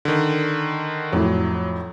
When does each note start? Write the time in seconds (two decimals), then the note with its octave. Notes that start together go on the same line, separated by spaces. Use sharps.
0.05 D3 D#3
1.13 F2 A2 F#3